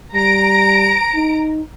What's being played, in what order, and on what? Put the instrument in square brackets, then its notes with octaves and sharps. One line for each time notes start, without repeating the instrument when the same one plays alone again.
[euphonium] G3 [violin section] A#5 D7 [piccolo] A#6
[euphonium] D#4